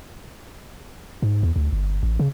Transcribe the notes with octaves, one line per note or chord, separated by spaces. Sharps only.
G#2
E2
D2
G1
A1
C#3